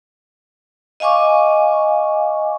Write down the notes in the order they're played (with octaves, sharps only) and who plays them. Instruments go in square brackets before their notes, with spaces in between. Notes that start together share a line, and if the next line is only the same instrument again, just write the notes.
[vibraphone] D#5 F5 G#5 C#6 D6